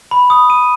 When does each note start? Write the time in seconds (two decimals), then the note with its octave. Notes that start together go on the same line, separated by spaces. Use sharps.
0.11 B5
0.30 D#6
0.50 D#7